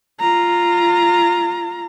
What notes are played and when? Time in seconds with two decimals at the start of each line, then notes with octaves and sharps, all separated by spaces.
0.20 F4 A#5